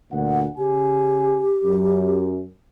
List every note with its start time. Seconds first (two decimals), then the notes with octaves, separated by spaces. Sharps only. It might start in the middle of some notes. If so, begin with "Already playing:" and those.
0.12 D2 A#2 F#5
0.58 C#3 G4 G#5
1.64 F#2